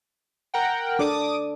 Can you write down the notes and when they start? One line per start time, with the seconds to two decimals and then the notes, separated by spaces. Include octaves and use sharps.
0.54 A#4 F#5 G5
0.99 D4 A4 D5 D6 D#6